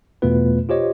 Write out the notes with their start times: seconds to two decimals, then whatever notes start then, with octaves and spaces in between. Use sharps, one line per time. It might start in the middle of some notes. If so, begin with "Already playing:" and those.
0.22 E2 B2 A3 B3 F4 B4
0.69 F4 G4 C5 C#5 D#5